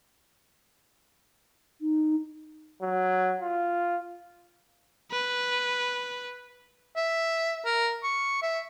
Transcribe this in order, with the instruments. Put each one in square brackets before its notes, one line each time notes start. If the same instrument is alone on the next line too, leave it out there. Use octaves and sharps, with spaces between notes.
[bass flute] D#4
[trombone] F#3
F4
[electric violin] B4
[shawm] E5
A#4
C#6
E5